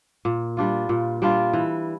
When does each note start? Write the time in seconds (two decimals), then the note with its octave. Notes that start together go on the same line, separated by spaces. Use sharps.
0.25 A#2
0.57 G3 D4 F4
0.89 A#2
1.22 G3 D4 F4
1.53 E3